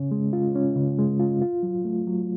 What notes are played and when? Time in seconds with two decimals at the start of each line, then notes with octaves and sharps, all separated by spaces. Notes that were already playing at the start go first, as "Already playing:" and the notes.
Already playing: C#3 C#4
0.11 G#3
0.33 F4
0.55 C#4
0.76 C#3
0.99 G#3
1.20 F4
1.42 F4
1.63 F#3
1.85 A3
2.07 F#3